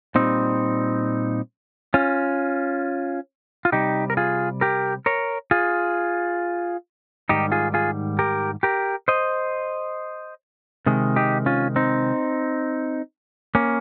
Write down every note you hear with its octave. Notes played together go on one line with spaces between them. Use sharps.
A#2 G3 C4 D#4
C#4 F4
F4
C3 G3 D#4 G4
A#4
F4 G#4
G4 A#4
A#4 C#5
F4 G#4
G#2 D#3 G3 D#4 G4
F4 G#4
F4 G#4
G4 A#4
G4 A#4
C5 D#5
C3 D#3 G#3
D#4 G4
C#4 F4
C4 D#4
A#3 C#4